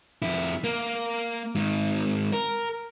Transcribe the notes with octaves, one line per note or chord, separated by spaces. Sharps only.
F2 E4
A#3
G#2 D#3
A#4